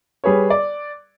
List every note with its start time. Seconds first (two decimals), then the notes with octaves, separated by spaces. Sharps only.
0.24 G3 G#4 B4 C#5
0.50 D5